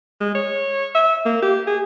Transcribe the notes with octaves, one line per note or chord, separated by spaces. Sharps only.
G#3
C#5
E5
A#3
G4
G#4